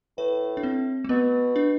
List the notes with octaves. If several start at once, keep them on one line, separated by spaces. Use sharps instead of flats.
A2 B4
D4
C4
A3
B2 B3
D4